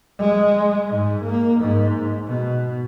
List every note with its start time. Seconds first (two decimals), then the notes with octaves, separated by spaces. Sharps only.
0.19 G#3
0.88 G#2
1.22 A#3
1.61 G#2
2.27 B2